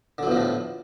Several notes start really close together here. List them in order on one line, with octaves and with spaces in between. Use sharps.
D3 F#3 E2 F3 A2